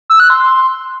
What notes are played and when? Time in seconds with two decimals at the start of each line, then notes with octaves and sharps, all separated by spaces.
0.10 E6
0.20 F#6
0.30 C6